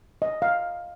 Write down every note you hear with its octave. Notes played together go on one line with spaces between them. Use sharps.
D#5
F5